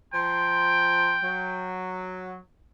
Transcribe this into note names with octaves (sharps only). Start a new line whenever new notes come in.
F3 G5 A#5 C6
F#3